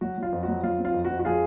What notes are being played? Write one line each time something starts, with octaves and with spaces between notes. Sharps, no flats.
F#3 F#4
F#3 F4
F2
F#4
F#3
F#3 F4
C4
F4
F2
F#4
F2
F#4
F3 F4 G#4